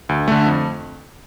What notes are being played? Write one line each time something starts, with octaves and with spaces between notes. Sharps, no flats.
D2
D3 A3
F2